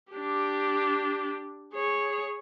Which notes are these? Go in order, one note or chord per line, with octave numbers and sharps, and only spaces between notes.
D4 G4
G#4 C#5